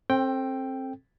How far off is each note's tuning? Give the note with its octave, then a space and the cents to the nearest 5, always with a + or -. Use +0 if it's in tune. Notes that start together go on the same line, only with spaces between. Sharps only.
C4 +25 A4 +0 G5 +0